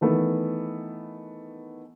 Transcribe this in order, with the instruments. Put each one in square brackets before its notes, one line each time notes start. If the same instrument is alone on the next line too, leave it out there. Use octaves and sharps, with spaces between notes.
[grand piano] D#3 E3 A3 B3